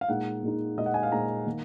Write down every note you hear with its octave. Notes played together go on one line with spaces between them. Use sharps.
F5
A#2 G#3 D#4 F#5
A#2 G#3 D#4
A#2 G#3 D#4 D#5
F#5
G#5
F5
A#2 G#3 D#4 A#5
D#3 A#3